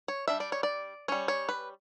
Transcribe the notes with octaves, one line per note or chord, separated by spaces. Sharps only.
C#5
G3 D4 E5
D5
C#5
D5
G3 C#4 C#5
C#5
B4